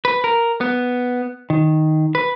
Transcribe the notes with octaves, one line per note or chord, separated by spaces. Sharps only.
B4
A#4
B3
D#3
B4